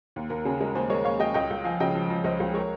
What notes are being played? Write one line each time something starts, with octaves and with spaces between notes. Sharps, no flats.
D#2
D#2 A#4
C#3 G#4
G#3 A#4
D#2 G#4 C5
G#3 A#4 C#5
D#2 C#5 F5
G#3 D#5 G5
C#2 D#5 G5
C#2
F3 F5 G#5
C#3 D#5 G5
F3
F3
C#2 C5 D#5
C#2
G#3 A#4 C#5